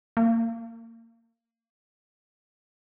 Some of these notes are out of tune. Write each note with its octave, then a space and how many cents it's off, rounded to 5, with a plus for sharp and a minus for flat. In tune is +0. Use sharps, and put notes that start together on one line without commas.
A#3 -20